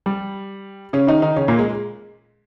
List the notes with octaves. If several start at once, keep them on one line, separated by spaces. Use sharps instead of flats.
G3
C#3 C#4
D#3 D#4
D#3 D#4
C#3 C#4
A#2 A#3
G#3